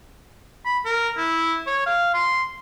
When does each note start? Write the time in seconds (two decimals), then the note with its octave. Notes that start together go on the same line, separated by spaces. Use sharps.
0.65 B5
0.86 A#4
1.17 E4
1.67 C#5
1.86 F5
2.14 C6